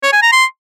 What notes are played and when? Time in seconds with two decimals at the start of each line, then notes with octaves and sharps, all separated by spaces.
0.03 C#5
0.13 G#5
0.22 A#5
0.32 C6